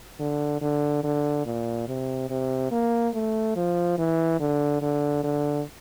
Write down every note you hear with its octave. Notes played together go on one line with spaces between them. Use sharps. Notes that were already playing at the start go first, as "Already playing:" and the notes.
D3
D3
D3
A#2
C3
C3
A#3
A3
F3
E3
D3
D3
D3